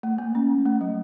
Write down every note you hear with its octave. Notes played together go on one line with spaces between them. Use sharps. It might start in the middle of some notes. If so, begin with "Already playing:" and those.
A3
A#3
C#4
A3
F#3